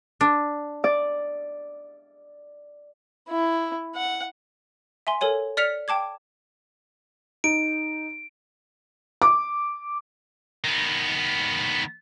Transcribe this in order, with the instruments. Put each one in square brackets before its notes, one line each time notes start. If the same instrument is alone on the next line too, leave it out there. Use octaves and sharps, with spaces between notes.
[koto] D4
[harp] D5
[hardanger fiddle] E4
F#5
[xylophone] E5 G#5 C6
A4 A#4 C#5 G#5
D5 F6 B6 C#7 F7
G5 A5 D6 G#6
[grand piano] D#4 [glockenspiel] D7
[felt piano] D6
[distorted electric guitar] D#3 B3